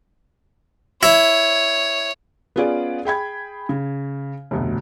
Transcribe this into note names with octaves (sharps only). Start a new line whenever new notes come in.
E4 C#5
B3 C#4 F4 G#4 D5
G#4 G5 B5 G#6
C#3
F1 D2 B2